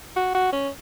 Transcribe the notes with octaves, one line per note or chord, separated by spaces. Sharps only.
F#4
F#4
C#4